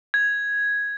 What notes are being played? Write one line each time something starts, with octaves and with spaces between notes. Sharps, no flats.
G#6